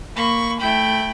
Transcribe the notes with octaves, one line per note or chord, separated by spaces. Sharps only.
A#3 B5 C#6
A3 E4 G5 B5